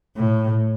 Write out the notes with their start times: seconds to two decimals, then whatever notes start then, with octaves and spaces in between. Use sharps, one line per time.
0.17 A2